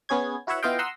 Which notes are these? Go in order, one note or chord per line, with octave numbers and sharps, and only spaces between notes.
B3 C#4 G#4 C#5 G#6
E4 F#4 B4 C#5 E5 F#5
B3 E4 F4 D#5 F5 G5
F#5 A#5 C6 D#6 E6